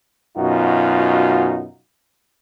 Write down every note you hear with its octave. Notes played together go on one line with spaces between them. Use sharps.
F#2 B2 D#4 F4 F#4